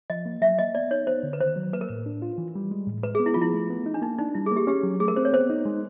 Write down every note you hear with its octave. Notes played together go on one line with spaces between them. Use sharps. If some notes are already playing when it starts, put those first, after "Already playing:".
F3 D#5
A#3
F#3 E5
A#3 D#5
B3 D5
D#4 C#5
B3 C5
D3
B4
D#3 C5
F#3
A#3 B4
A#4
A2 B4
D4
F4
E3
G3
G#3
A2
G#3 B4
B3 G#4
E4
F3 F4
E4
A3
B3
D#4
D4
A#3 D#4
D4 D#4
G3 E4
G#4
A#3
G4
C#4 G4
F#3
A3 G#4
A#4
C4 C5
C#5
B3 C5
D#4
G#3